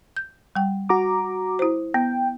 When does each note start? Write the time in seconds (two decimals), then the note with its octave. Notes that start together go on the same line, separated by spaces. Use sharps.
0.16 G6
0.55 G3 G5
0.89 F#4 A#5 D6
1.59 E4 C5
1.94 B3 G5